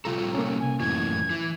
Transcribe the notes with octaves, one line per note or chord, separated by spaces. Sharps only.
C3 G3 F4 A4 A#5
A#3 C#4
G#5
F#2 A2 E3 G#6
E3